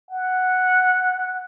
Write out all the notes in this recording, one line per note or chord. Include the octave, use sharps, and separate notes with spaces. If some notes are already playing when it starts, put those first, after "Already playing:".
F#5